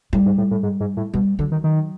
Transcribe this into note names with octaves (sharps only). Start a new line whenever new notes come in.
A2 G3
G#2
A2
A2
G#2
G#2
A2
B2 G3
D3 F#3
D#3
D#3